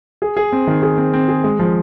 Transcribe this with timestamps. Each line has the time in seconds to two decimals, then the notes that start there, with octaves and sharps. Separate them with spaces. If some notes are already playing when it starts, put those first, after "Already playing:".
0.22 G#4
0.37 G#4
0.52 C4
0.67 D#3
0.82 G#4
0.98 C4
1.13 C4
1.28 G#4
1.44 G#3
1.59 F3